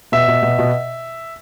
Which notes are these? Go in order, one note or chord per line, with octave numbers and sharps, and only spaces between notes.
B2 E5
B2
B2
B2